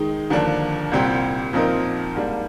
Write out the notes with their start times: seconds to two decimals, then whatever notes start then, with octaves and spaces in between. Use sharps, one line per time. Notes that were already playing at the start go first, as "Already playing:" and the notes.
Already playing: D#3 G#3 D#4
0.30 D#2 D3 F3 A#3 D4
0.91 C2 A#2 G3 C4 G4
1.53 A#2 F3 C4 D#4 A#4
2.15 G#2 G3 A#3 D4